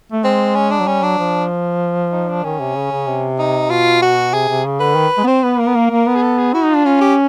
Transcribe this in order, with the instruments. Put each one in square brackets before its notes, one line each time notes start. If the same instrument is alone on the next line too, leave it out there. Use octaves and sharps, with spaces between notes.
[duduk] A3
[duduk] G#3 [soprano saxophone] C4
[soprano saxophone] C#4
D4
[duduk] F#3
[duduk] G3 [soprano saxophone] C#4
[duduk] F#3 [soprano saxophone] D4
[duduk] F3
[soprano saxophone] D#4
D4
[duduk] D#3 [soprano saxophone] C#4
[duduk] C3
C#3
C#3
C3
[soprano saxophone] D#4
[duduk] B2 [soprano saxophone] F4
[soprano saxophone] F#4
[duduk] C3 [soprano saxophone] G#4
[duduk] C3
C#3
[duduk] D3 [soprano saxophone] B4
[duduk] D#3
G#3
B3
[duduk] C4 [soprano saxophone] C5
[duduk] B3 [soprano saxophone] B4
[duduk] A#3 [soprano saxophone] A#4
[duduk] B3
A#3
A#3
B3
[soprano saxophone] G#4
A4
G#4
[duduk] E4 [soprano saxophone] F#4
[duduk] D#4
[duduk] D4 [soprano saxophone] F4
[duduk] C#4 [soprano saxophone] F4
[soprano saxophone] G4